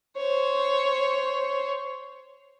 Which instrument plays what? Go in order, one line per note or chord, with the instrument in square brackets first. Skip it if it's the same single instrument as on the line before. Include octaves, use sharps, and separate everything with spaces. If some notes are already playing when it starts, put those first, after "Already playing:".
[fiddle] C5 C#5